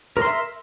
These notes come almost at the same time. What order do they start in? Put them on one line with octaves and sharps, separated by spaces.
A#4 C6 E5